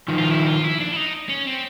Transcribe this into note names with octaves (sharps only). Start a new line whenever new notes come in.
D#3 F3
F4
E4
F4
E4
D4
E4
D#4
C#4
C4